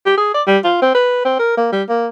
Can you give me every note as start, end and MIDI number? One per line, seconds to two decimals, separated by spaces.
0.06 0.15 67
0.17 0.33 68
0.34 0.42 74
0.47 0.58 55
0.64 0.81 65
0.82 0.92 60
0.95 1.21 71
1.25 1.37 60
1.39 1.56 70
1.57 1.68 58
1.72 1.82 55
1.89 2.08 58